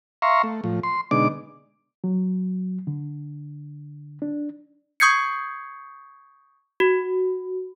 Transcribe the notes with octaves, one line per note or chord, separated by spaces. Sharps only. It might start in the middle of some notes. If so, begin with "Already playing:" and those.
E5 F5 A#5 C6 C#6
A3
A2 F3
C6
B2 D3 G#3 D4 D#4 D6
F#3
D3
D4
C#6 D#6 G6 G#6 C7 C#7
F#4